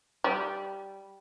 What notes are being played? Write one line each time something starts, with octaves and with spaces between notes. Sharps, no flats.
G3